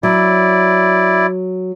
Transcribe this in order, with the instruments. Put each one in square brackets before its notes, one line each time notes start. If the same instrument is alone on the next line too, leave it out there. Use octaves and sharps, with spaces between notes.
[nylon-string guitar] F#3 [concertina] E4 D5